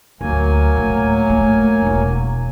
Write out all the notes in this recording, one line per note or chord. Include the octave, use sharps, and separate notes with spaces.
D2 F#3 A#3 G#5
A2
A3
E1 E4